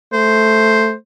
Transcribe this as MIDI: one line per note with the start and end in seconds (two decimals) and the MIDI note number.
0.13 0.94 57
0.13 0.93 72